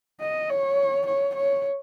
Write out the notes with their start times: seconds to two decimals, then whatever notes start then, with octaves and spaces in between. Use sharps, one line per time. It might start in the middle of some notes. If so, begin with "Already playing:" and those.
0.21 D#5
0.49 C#5
1.07 C#5
1.35 C#5